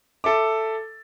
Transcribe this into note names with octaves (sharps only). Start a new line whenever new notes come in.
A4 E5 D6